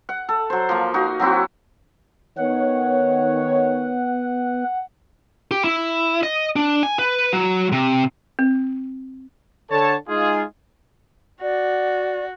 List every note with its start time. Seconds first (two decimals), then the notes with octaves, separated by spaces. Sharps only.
0.09 F#5
0.29 A4
0.50 F#3 C5
0.69 F3 A#3
0.94 D#4 F#4
1.19 F#3 C4 E4 F#4
2.38 D#3 B3 B4 C#5 F#5
5.51 G4
5.64 E4
6.23 D#5
6.56 D4
6.83 G#5
6.99 B4
7.32 F#3
7.72 C3
8.39 C4
9.71 D3 A4 C#5 A5
10.08 G#3 D#4 F4 G#4
11.42 F#4 D5